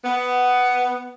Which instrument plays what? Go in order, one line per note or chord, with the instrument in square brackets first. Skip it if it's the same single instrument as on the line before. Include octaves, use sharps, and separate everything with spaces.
[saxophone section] B3